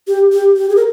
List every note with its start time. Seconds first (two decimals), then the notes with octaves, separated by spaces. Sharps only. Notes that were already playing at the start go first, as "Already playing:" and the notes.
0.07 G4
0.32 G4
0.57 G4
0.70 G#4
0.76 A#4